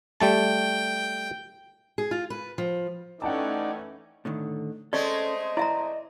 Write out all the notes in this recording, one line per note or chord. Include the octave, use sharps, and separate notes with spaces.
G3 A3 G5 A5
G#4
F4
B4
F3
E3 A3 C#4 D#4 D5 F#5 G5 A5
A2 D3 D#3
G#3 A3 C4 C#4 A4 D5 D#5
E4 D5 E5 A#5